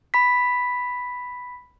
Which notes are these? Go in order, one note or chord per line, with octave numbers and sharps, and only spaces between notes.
B5 B6